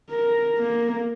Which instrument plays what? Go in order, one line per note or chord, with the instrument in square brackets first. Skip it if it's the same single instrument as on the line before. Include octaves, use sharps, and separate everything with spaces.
[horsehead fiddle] A#4
A#3